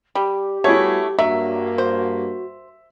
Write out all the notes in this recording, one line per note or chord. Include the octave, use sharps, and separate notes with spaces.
G3 G4
G3 A3 B3 E4 F#4 G#4 C#5
G2 F#3 A#3 F#4 E5
C5